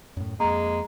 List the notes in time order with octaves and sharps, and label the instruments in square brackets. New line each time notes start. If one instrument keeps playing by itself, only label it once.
[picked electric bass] F#2 A2
[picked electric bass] F2 A#3 [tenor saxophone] G#3 [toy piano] A#5